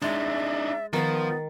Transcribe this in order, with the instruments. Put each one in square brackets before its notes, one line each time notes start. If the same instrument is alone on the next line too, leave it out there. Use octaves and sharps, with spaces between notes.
[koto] G#3 [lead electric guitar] D4 D#4 [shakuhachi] E5
[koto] D#3 [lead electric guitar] F3 [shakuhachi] B3